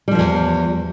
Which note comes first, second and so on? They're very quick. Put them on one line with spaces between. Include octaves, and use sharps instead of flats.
G3 F3 G2 E2